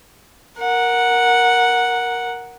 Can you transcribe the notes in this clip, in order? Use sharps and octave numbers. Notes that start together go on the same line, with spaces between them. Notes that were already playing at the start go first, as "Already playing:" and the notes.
A#4 F#5